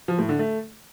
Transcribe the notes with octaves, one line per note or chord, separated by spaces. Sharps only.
F3
A2
D3
A3